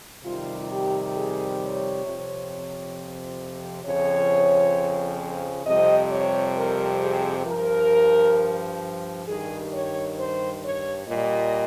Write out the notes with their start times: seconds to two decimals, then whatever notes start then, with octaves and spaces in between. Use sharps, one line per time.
0.24 F2 C3 D#3 G3 F4
0.69 G4
1.14 G#4
1.59 C#5
2.05 F2 C3 F3
3.84 F2 C#3 F3 C#5
5.65 F2 C3 G3 D#5
6.10 C#5
6.55 A#4
7.01 G#4
7.46 G2 F3 A#4
9.26 G2 D#3 G3 G#4
9.71 C#5
10.17 C5
10.62 C#5
11.06 A#2 G3 D#5